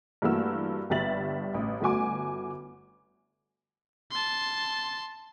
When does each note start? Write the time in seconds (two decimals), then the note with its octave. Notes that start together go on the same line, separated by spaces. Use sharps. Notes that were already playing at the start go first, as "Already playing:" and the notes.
0.22 G2 E3 A3 A#3 F#4 E6
0.90 G1 G2 G3 E5 A6 F#7
1.54 A1
1.81 G1 A3 F#4 G#5 D6
4.11 A5 C6